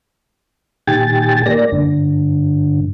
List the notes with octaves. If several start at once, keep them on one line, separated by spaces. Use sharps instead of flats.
A#2 D#3 G4 G5 G#5 A6
A#3 D5 A#6
G2 D3